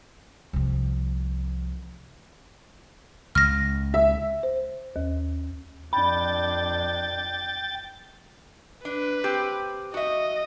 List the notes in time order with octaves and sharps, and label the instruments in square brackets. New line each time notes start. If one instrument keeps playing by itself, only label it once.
[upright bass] C2 F3
[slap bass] C#2 [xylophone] F6 A#6
[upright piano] E5
[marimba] C5
D#2
[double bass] F2 D4 [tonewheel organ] G5 A6 [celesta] B5
[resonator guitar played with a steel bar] D4 [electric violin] B4
[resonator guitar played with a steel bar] C4 G4
[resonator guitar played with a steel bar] F#4 E5 [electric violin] D#5